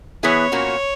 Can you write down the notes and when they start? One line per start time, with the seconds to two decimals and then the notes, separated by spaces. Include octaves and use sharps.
0.23 E3 B3 E4 G#4 C#5
0.52 A#2 A#3 C#4 F#4